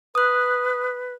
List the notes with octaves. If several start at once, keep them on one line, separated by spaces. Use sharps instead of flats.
B4 D#6 F#6